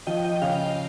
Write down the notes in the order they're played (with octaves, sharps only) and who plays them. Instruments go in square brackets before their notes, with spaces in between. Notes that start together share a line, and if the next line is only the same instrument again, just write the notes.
[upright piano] F3 [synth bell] D#5 G5
[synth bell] D#5 G5
[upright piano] C#3 [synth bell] F5